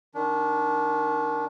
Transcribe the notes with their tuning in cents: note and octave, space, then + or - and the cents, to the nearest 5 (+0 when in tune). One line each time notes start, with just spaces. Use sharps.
D#3 +0 D4 -25